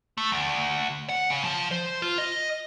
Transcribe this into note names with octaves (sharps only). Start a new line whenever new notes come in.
A3
D2
F#5
C#3
F3
C5
F4
D#5